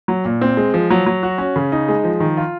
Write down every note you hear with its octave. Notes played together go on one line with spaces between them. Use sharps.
F#3
A#2
C4
G#3
F3
F#3
F#3
F#4
C#4
C#3
D#4
G#3
F3
D#3
F4